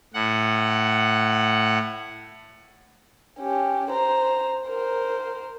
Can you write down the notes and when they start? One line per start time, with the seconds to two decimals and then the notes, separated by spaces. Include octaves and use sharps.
0.14 A2 F#5
3.40 C#4 G4
3.91 C5 A#5
4.67 A#4 C5